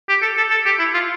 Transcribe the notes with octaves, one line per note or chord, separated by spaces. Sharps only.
G4
A4
A4
A4
G4
E4
F4